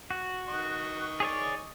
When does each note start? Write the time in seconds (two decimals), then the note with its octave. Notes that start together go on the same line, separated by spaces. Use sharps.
0.11 F#4
0.49 D#3 D#5 C#6
1.20 G#4 C#5 D5